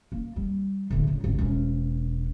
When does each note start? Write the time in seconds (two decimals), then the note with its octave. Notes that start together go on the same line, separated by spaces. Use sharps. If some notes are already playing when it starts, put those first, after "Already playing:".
0.12 A#3
0.36 G3
0.90 A2 D3
1.07 C#2
1.24 G#1
1.38 E1 C#4